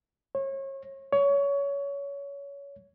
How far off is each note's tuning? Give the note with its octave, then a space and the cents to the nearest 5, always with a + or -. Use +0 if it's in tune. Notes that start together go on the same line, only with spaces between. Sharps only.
C#5 -35
C#5 +20